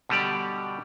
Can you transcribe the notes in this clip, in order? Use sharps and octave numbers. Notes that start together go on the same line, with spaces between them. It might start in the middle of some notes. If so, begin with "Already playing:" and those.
B2 D3 G3 G4 D5